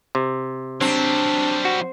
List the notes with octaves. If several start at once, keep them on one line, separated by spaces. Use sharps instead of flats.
C3
F#3 G3 C4 D4
F#4